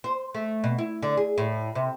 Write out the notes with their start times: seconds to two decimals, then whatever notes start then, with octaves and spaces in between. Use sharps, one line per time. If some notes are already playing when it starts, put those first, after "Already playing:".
0.04 C5
0.35 A3
0.64 B2
0.78 E4
1.02 D3
1.17 G#4
1.38 A2
1.75 C3